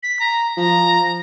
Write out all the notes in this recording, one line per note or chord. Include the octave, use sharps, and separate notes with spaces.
B6
A#5
F3 A#5